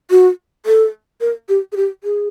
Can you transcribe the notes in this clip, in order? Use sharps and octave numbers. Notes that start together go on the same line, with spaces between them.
F#4
A4
A#4
G4
G#4
G4
G#4